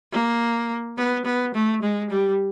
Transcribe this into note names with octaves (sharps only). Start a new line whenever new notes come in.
A#3
B3
B3
A3
G#3
G3